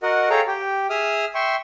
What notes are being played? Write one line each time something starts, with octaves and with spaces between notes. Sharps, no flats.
F#4 A#4 D#5 F#5
G#4 A4 C#5 F5 G5 A#5
G4 G5
G#4 E5 D#6 F6
E5 G5 C6 C#6